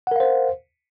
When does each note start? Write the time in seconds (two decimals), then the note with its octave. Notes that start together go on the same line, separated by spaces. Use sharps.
0.07 F#5
0.11 A#4
0.16 F5
0.20 C5